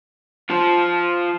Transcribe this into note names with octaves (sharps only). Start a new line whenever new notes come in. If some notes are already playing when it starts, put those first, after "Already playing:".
F3 F4